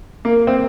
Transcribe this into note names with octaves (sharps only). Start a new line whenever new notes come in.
A#3
C4